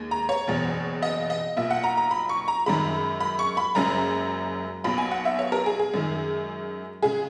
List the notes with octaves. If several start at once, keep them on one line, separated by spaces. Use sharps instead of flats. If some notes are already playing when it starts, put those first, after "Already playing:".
Already playing: D#2 G#3
A#5
C#5
F#1 E2 B2
D#5
D#5
B1 A#2 A#3 E5
F#5
A#5
A#5
B5
C#6
A#5
F#2 D#3 G#3 B5
B5
C#6
B5
F#1 F#2 C#3 G#3 A#5
B1 B2 F#3 A#3 B5
G#5
F#5
E5
C#5
A#4
G#4
G#4
F#2 D#3 G#3
C#3 G#3 G#4